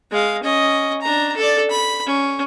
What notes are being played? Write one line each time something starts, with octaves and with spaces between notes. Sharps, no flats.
G#3 F5
C#4 D#5
D4 A#5
A4 D5
B5
C#4